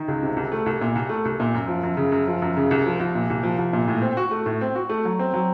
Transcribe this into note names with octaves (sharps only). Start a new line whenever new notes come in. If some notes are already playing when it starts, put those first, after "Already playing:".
Already playing: D#3
C#2
C3
C2
A3
C2
A#2
C2
A3
C2
A#2
F#2
F3
F#2
C#3
F#2
F3
F#2
C#3
C2
F3
C2
A#2
C2
F3
C2
A#2
A2
C4
F#4
A3
A2
C4
F#4
A3
F#3
C4
F#3